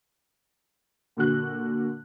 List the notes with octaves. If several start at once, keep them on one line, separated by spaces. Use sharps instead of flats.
A#2 D3 F#4 F#6